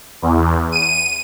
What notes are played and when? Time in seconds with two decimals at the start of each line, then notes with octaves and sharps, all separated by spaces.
0.22 E2
0.72 D#7